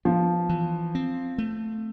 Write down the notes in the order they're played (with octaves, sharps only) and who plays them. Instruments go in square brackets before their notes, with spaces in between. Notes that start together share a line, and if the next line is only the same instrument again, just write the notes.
[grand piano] F3 [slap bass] B3
[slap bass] E3
C4
A3